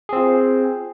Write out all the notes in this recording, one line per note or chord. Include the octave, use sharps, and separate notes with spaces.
C4 F4 G#4